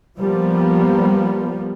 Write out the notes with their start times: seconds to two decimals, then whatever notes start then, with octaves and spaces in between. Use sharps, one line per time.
0.17 F3 G3 A#3 B3